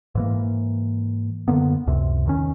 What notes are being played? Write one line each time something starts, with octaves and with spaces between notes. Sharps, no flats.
G#2 E3 A#3
F#2 D3 A#3 B3
C#2 F#2 C3
E2 D#3 C#4